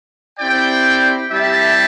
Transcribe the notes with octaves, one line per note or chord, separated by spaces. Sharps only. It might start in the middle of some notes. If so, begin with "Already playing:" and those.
C4 E4 G4 D5 G5
G3 C4 E4 G4 E5 A5